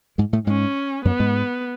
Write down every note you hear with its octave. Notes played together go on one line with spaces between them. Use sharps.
G#2 G#3
A2 A3
G#2 G#3 C#4
F#2 F#3 B3
G#2 G#3